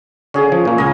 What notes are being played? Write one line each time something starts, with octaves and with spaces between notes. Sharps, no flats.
D3 C#4 G#4
F3
A#2 A#3
C#2 D#5 F5 G#5